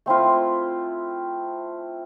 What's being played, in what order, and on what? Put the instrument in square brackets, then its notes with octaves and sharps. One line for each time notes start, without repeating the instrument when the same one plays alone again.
[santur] A3 C4 E4 F4